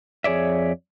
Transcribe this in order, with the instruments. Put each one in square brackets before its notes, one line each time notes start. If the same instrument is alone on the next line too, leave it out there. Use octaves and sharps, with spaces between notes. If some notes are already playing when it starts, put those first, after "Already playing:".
[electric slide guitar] F2 G#4 C#5 D5 E5